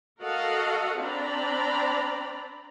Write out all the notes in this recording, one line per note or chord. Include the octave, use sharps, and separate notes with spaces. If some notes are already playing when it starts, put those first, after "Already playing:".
F#4 A4 A#4 D#5 F5 F#5
C4 D4 D5 A#5 B5